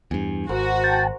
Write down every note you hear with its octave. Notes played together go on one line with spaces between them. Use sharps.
E2 G2 G#5
G#1 F#4 A#4 C5
G5 A5